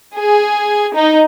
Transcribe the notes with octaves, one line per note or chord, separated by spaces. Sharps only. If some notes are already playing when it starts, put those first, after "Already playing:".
G#4
D#4